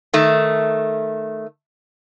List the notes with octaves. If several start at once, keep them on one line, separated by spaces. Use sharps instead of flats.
D#3 A3